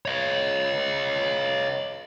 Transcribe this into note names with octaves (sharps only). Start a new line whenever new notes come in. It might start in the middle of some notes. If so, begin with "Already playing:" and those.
C#5 D#5